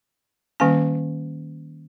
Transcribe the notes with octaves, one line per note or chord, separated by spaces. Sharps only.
D#3 G3 A#3 C#4 G#5